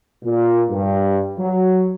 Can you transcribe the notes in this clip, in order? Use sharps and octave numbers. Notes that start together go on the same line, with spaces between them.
A#2
G2
F#3